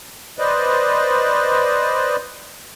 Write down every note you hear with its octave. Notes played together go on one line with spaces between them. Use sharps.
B4 C5 D5 D#5